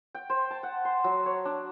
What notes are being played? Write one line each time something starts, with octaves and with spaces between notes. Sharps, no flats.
G5
C5
A5
F#5
C6
F#3
C#5
D4